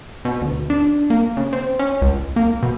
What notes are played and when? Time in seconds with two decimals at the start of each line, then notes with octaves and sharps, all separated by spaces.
0.25 B2
0.42 D2
0.70 D4
1.10 A#3
1.37 C#3
1.53 C4
1.79 C#4
2.02 C#2
2.36 A#3
2.63 B2